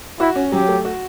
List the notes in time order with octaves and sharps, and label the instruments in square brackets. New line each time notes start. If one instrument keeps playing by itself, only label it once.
[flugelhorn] E4 [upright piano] F#4
[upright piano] C#4
[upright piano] F#3 [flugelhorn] G4
[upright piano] A3
F#4